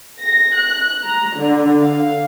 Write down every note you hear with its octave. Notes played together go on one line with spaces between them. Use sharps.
A#6
F#6
A#5
D3
F5